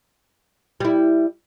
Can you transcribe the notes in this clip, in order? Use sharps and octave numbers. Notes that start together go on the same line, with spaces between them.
G3 E4